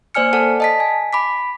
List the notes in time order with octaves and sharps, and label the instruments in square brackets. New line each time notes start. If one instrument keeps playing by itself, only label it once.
[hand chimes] A#3 C5 D5 G#5 F6 C#7
A4 D5 F#5 A5
D#5 A5 B6
G#5
B5 D6 B6